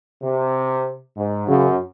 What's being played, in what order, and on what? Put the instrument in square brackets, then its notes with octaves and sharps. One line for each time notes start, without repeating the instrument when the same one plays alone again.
[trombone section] C3
G#2
[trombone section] F#2 [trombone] C#3